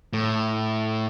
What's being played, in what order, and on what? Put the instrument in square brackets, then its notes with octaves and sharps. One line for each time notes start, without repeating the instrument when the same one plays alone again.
[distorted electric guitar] A2